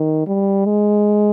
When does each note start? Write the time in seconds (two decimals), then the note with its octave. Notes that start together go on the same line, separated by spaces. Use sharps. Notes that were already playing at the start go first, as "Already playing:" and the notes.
Already playing: D#3
0.27 G3
0.66 G#3